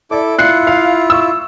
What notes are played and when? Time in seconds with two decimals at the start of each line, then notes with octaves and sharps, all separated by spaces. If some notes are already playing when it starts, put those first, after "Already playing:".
0.11 E4 A4 D5 D6
0.38 E4 F4 F#6 C7 C#7
0.67 F5
1.10 C#6 E6